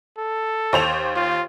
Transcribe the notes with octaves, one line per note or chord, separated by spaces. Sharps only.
A4
D#2 C5 F7
F4